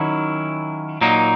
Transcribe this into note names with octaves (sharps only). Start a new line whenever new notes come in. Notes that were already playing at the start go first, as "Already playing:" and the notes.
Already playing: D#3 F#3 C#4 E4
A#2 F#3 A#3 D#4